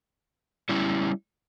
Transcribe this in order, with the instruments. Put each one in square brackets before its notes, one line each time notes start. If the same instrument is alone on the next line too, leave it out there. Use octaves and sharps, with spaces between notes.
[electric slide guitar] G3 C#4 E4